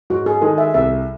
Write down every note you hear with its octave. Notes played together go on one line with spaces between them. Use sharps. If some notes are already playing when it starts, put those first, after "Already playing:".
G#2 F#4
G#4
D#3 G#3 D#4 G#4 A4
E5
C2 E5